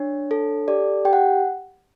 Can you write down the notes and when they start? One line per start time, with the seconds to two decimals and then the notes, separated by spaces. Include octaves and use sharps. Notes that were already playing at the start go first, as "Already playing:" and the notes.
Already playing: D4 C#5
0.31 A4
0.68 G4 D5
1.05 G4 G5
1.13 F#5